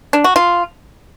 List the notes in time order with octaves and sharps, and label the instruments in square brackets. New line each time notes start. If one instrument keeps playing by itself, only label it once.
[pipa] D4
F#4
F4